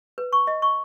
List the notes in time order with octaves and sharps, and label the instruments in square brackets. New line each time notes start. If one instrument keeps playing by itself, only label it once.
[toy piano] B4
C#6
D#5
C#6